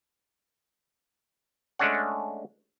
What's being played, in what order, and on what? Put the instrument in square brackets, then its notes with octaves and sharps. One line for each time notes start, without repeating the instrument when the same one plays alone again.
[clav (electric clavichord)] G#3 A3 C#4 D4 C#5 F#5